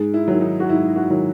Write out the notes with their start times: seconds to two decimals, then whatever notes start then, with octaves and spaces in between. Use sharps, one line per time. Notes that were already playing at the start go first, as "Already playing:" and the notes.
Already playing: G#2 G#4
0.14 E4
0.28 D#3 F#3
0.41 D#4
0.60 F#4
0.69 G#2 E4
0.96 F#4
1.10 D#3 F#3